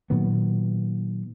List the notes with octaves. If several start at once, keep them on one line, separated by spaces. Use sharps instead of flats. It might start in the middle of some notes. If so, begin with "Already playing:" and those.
A#2 D#3 F#3 B3